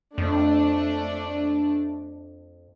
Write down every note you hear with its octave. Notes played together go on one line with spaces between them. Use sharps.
F2 A3 D4